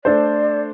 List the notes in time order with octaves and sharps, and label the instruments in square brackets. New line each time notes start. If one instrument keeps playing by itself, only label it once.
[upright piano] A3 D4 A4 C5 [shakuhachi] D5